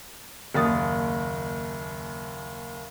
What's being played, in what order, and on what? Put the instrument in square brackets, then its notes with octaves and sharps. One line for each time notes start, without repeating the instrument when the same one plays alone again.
[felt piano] F#1 D#2 A#4 D#6 A6